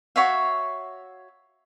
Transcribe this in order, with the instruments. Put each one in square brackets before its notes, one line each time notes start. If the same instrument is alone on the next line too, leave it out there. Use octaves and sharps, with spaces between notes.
[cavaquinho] F#4 C#5 E5 F5